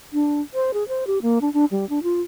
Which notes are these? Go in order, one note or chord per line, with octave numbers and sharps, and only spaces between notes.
D4
C5
G#4
C5
G4
A#3
D4
D4
G3
D4
F4